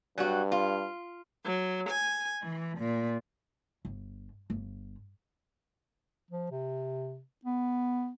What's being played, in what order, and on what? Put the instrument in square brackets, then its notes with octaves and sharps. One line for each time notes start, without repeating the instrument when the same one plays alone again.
[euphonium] G2 [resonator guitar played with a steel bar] F#3 G3 F#4
[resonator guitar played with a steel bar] F4
[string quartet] F#3
G#5
E3
A#2
[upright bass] G1
G1
[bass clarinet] F3
C3
B3